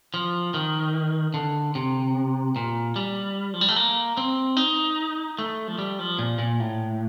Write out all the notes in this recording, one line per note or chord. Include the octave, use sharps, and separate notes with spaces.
F3
D#3
D3
C3
A#2
G3
F3
G3
A3
A#3
C4
D#4
A3
F3
G3
F3
A#2
A#2
A2